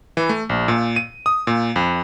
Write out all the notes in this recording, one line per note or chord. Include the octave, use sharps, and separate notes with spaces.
E3
A3
A#1
A#2
D#7
D#6
A#2
F2